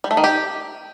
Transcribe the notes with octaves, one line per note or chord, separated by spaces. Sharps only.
G3
A3
D#3
G4